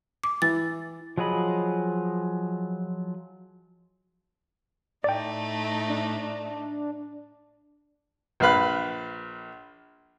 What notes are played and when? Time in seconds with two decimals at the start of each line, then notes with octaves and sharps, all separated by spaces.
0.24 D6
0.42 E3 A6
1.18 F3 F#3 G#4 D#5 B5
5.04 A2 A3 D#4 D5 G5
5.89 D4
8.40 A#1 B4 F5 B5 F#6